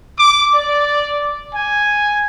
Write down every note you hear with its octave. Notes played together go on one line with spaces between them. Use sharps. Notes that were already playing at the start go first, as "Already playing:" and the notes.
D6
D5
G#5